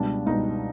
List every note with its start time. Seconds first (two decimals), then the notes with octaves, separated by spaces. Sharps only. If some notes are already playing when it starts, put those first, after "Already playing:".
Already playing: C#2 B2 G3 D4
0.26 C#2 B2 G3 D#4